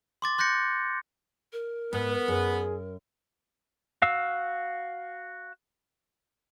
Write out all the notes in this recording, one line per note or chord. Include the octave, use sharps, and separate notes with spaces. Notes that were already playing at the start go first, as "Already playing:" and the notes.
C6 D6 A6
C6 F#6 G6 A#6 C#7
A#4
G#2 B3
F#2 G#4
F#4 F5 E6